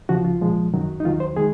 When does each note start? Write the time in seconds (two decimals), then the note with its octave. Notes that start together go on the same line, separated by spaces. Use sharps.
0.09 C#2 C#3 F3 F#4
0.25 F4
0.41 C2 A#2 F3 G#3
0.74 F#2 D#3 F#3
1.00 D#4
1.04 D#2 D#3 F#3 F4
1.20 C5
1.36 D#3 G#3 G#4